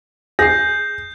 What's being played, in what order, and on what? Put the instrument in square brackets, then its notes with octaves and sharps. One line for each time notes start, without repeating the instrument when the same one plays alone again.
[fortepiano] G#4 [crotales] G6 [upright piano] A#6 C7